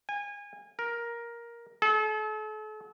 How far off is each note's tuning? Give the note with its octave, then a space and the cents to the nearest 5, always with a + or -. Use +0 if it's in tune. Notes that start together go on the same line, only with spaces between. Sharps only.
G#5 -25
A#4 +10
A4 -40